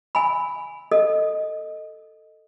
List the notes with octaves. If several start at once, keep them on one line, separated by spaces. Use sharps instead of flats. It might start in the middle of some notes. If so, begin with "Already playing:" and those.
G#5 B5
A4 D#5